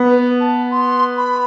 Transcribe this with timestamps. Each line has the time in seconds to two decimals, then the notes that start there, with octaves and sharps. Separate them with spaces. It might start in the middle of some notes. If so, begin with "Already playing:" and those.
Already playing: B3
0.09 B4
0.40 A5
0.71 C6
1.17 B5